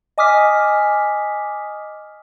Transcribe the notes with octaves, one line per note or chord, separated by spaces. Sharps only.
D#5 G#5 D6 D#6 F6 B6